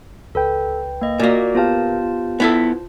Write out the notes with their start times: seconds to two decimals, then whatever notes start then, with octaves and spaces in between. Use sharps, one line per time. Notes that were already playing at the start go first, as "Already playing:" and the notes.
0.35 C#2 A4 B4 G5
1.01 A#3 D#5
1.19 A#2 A#3 F#4 D5
1.55 B3 F4 G4 C5 F5 A5
2.40 B3 E4 A4